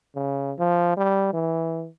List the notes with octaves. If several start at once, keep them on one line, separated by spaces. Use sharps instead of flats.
C#3
F3
G3
E3